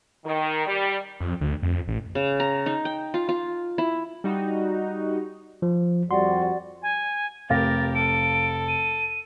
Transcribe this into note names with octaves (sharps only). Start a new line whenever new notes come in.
D#3
G3
F2
D2
F2
A1
C#3
A#5
D#4
G5
F4
F4
E4
G3 D#4 F#4
F3
F2 G3 F#4 D5 C6
G#5
F1 G4 A#4 F5 A6 A#6
A4 D7
D#7